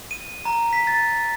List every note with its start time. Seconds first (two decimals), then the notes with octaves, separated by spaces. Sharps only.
0.11 D#7
0.45 A#5
0.73 B6
0.87 A6